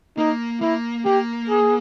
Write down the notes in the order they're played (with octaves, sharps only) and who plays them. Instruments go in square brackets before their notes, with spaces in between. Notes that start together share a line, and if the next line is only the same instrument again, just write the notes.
[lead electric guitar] A#3 [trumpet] D#4
[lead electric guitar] A#3 [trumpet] E4
[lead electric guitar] A#3 [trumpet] G4
[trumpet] G#4